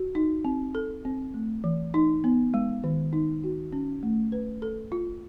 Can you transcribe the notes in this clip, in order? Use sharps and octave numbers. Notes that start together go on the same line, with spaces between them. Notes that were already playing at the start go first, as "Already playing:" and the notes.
Already playing: F#4
D#4
C4
A4
C4
A3
E3
D#4
B3
G#3
D#3
D#4
F#4
C#4
A3
B4
A4
F4